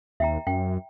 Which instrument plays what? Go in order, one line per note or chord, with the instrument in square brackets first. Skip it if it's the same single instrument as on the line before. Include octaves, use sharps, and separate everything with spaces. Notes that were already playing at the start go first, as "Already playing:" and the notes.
[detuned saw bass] D#2 [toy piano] E5 G5 A#5
[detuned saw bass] F#2 [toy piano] G5